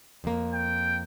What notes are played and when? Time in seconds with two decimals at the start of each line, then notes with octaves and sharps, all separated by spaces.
0.24 F2 A#3
0.53 G5